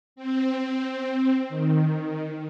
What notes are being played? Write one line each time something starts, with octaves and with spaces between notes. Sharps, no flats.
C4
C4
D#3